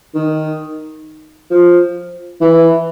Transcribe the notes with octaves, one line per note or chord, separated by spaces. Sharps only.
D#3
F3
E3